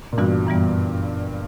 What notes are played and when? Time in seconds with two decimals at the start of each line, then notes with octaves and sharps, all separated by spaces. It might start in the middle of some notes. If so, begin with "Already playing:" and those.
0.13 A#2
0.18 G2 E3 B3 F#4
0.47 F#2 E3 G3 B3